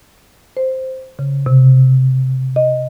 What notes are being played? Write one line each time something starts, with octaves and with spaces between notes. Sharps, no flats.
C5
C#3
C3
D#5